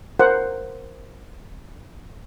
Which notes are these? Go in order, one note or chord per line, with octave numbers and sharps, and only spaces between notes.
A#4 C5 F#5